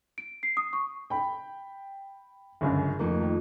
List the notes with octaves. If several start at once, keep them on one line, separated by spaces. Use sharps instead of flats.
D7
C7
D#6
C#6
G5 B5
G1 C#2 F#2
F2 D#3 A3 A#3
D#3